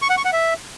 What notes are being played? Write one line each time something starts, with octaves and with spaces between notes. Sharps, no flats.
C#6
F#5
C#6
F#5
E5